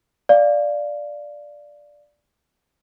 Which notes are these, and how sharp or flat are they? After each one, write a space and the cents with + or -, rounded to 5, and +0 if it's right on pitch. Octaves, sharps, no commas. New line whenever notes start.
D5 +0 F5 +0